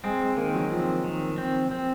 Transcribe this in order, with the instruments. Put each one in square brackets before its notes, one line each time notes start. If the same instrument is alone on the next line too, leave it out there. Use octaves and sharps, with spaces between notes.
[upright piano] G#3 [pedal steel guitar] C4
[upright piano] G#3
[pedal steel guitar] D#3 [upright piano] A#3
[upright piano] F#3
[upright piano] F3 [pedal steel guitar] C4
[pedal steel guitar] D#3
C4
C4